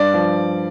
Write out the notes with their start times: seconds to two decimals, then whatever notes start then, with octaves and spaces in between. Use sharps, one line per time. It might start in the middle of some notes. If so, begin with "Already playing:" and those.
Already playing: G2 D5
0.14 F3